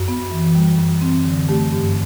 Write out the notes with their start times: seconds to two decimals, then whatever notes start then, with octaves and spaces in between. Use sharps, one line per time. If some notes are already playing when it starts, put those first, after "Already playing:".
Already playing: F#2 F#4
0.08 B3
0.32 E3
0.55 G3
0.78 F#2
1.01 C4
1.25 D3
1.49 A3 G4
1.72 G2